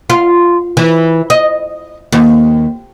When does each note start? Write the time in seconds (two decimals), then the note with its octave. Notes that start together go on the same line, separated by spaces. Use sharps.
0.10 F4
0.77 E3
1.30 D#5
2.12 D#2